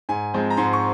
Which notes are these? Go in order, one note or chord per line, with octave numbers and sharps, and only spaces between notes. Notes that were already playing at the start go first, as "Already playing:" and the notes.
G#2 G#5
F3 G#3 C4
A#5
G#2 C6
C#6